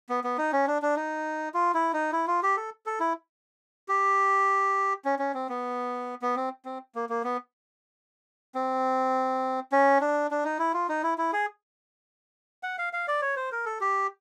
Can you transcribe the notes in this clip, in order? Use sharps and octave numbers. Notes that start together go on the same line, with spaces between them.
B3
B3
D#4
C#4
D4
D4
D#4
F4
E4
D#4
E4
F4
G4
A4
A4
E4
G4
C#4
C#4
C4
B3
B3
C4
C4
A#3
A#3
B3
C4
C#4
D4
D4
D#4
E4
F4
D#4
E4
E4
G#4
F#5
F5
F5
D5
C#5
C5
A#4
A4
G4